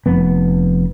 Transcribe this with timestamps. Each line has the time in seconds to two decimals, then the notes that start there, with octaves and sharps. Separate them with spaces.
0.06 F1 F2 B3